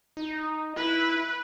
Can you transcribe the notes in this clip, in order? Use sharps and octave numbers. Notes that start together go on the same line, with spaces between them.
D#4
E4 B4